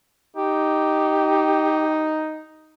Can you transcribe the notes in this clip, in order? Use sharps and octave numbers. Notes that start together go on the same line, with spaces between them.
D#4 G4